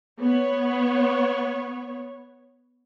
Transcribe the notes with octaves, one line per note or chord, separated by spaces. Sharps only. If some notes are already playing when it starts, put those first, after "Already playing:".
B3 C#5